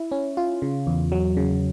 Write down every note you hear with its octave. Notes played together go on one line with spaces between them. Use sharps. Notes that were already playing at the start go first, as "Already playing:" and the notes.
Already playing: E4
C#4
F4
C#3
E2
F#3
C#3